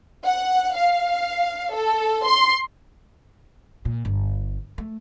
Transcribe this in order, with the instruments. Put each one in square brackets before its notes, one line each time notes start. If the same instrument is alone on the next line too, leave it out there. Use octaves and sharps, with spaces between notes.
[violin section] F#5
F5
A4
C6
[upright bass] A#2
G1
A3